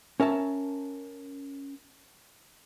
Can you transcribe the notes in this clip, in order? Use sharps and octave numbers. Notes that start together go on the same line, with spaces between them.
C#4 A#4 E5 A5